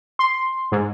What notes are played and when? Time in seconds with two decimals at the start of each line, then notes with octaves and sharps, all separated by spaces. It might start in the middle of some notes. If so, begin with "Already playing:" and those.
0.19 C6
0.72 G#2